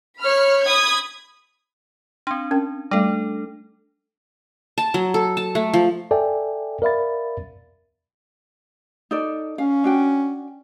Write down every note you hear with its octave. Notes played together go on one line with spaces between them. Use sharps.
C#5 B5 F6
B5 D#6 G#6
C4 D4 C6
C#4 A#4 G5
G3 A3 D4 A4
A5
F#3
A4
A5
A3
F3
A4 D5 E5 G5 G#5
A#4 D5 E5 F5 B5 A6
D#4 A4 D5
C#4 F5
D4 F#4 G5